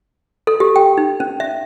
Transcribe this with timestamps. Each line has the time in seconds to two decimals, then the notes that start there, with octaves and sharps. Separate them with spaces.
0.47 A4
0.60 G4
0.76 G5
0.98 D#4
1.20 C#4
1.40 E5